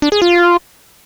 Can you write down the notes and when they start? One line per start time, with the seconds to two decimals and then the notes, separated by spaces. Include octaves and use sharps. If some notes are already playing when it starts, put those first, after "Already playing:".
0.02 D4
0.12 G#4
0.22 F4